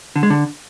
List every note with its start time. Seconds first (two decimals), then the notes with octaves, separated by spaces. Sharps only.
0.16 D3
0.23 G#3
0.30 D3